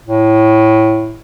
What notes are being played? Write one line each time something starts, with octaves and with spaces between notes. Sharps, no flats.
A2